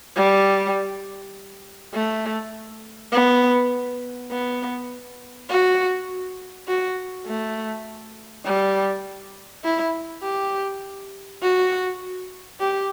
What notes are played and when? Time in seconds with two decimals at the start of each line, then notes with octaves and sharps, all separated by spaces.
0.16 G3
1.94 A3
3.12 B3
4.31 B3
5.49 F#4
6.68 F#4
7.27 A3
8.45 G3
9.64 E4
10.23 G4
11.42 F#4
12.61 G4